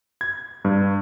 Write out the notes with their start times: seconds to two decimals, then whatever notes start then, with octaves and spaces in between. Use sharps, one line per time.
0.21 G#6
0.65 G2